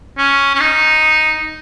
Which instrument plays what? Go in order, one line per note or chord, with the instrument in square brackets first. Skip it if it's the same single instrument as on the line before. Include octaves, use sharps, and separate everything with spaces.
[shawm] C#4
C#4
D#4